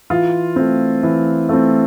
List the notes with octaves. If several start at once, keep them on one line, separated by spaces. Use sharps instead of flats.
E3 F4
A3 C4
E3
A3 C4